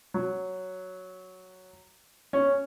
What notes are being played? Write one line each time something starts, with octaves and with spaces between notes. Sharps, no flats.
F#3
C#4